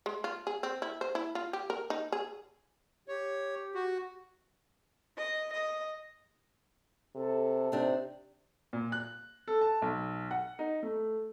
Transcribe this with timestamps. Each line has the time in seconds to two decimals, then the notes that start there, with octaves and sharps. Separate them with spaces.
0.06 G#3
0.24 F4
0.47 G#4
0.63 C4
0.82 E4
1.01 C5
1.15 E4
1.35 F4
1.53 G4
1.70 A#4
1.90 D#4
2.12 G#4
3.08 G4 C#5
3.74 F#4
5.17 D#5
5.53 D#5
7.15 C3 A4
7.72 C3 C4 D4 D#4
8.73 A#2
8.92 F#6
9.48 A4
9.61 A5
9.82 B1
10.31 F#5
10.59 D#4
10.83 A3